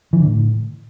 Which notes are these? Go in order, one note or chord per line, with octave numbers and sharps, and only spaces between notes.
E3
D3
A2